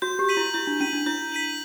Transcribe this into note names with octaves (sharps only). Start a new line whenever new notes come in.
F#4 G6
G4
B6 D#7 F#7
E4
E4 G6
D4
C#4 B6 D#7 F#7
D4
E4 G6
B6 D#7 F#7